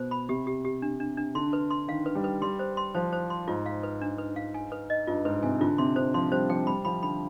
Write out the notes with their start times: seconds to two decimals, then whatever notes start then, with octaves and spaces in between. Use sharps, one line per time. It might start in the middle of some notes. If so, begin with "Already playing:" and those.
Already playing: B2 C5
0.11 B5
0.29 C3 G4
0.47 G4
0.65 G4
0.82 D4
1.00 D4
1.17 D4
1.35 D3 C6
1.53 B4
1.70 C6
1.88 D#3 F5
2.06 B4
2.15 G3
2.24 B4
2.42 G3 C6
2.59 C5
2.77 C6
2.95 F3 C5
3.13 C5
3.30 C6
3.47 G#2 F4
3.66 F5
3.83 B4
4.01 D4
4.18 B4
4.36 F5
4.54 G#5
4.72 B4
4.90 D#5
5.07 G2 F4
5.25 G#2 B4
5.43 C3 G#5
5.60 D3 F4
5.78 C3 C6
5.96 D3 C5
6.14 F3 C6
6.31 G3 C5
6.49 F3 G5
6.67 G3 B5
6.85 F3 B5
7.03 D3 B5